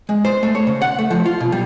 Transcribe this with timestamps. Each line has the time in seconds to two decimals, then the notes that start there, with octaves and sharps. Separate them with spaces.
0.09 G#3
0.25 C5
0.43 A3
0.55 C#5
0.67 C#3
0.82 F#5
0.99 A3
1.10 F3
1.26 F4
1.40 B2
1.52 G3